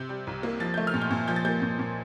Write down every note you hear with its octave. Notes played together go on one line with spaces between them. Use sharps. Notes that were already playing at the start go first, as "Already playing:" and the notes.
Already playing: C3 G6
G3
C2
A#3
F3 A6
A3 G6
F6
A#2
G6
A#2
F3 G6
A6
A#3 G6
A#2
A#2